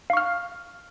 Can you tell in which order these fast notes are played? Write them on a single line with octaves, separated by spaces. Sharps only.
F5 C#6 F6